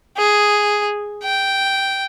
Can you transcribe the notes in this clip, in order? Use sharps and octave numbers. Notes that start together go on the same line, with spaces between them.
G#4
G5